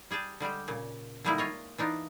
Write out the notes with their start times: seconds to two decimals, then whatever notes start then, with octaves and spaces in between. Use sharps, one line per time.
0.11 G3 G#4 G5 A5
0.40 D3 G3 G#3 G4
0.68 A#2 C#3
1.24 D3 D#3 G3 G#3 A#3 E4
1.38 F4 C#5 D#5
1.78 E3 D4 D#4 F4